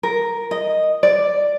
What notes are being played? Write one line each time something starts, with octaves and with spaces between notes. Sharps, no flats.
A#4
D#5
D5